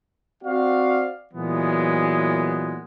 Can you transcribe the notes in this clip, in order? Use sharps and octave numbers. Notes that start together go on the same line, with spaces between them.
C4 F#4 D5 F5
A#2 E3 F#3 G#3 B3